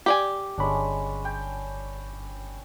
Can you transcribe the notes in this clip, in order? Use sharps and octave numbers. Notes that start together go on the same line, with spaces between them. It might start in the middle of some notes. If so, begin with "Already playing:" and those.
G4 D5 G#5
G1 G#3 C#4 D4 B5
G5